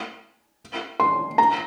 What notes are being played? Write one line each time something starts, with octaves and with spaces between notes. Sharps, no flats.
C6
A#5